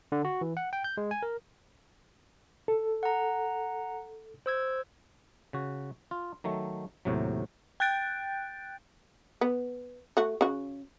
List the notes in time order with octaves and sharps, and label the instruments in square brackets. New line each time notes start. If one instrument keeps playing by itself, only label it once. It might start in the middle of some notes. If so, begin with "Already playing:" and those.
[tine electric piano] D3
F#4
E3
F#5
G5
G6
G#3
G#5
A#4
[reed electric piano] A4
[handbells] F#5 A#5
C5 E6 G#6
[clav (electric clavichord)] C#3 F#4
F4
D#3 F#3 A3
D#2 A2 C3 F#3
[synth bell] G5 F#6 G6 A6 D7
[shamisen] B3
A3 F#4
C#3 F#4